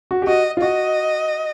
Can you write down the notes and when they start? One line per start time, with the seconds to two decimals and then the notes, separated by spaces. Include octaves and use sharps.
0.11 F#4
0.22 G4
0.27 F#4 D#5
0.57 F4
0.61 F#4 D#5